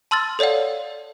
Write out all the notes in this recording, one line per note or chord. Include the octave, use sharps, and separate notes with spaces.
A5 C6 E6 F6 A6
A4 C#5 D5 F5 F#5